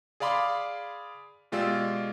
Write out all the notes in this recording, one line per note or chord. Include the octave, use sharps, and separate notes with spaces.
G#4 D5 F5 B5 C6 D6
B2 G#3 F4 G4 D5 E6